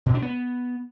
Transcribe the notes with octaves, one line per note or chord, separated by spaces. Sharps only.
B2
D4
B3